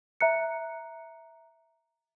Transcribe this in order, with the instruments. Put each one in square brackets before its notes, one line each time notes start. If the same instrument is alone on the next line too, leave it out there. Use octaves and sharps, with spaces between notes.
[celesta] E5 A#5 F#6 C#7